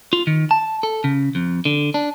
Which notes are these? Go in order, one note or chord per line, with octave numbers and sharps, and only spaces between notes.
F4
D#3
A5
A4
C#3
F2
D3
D4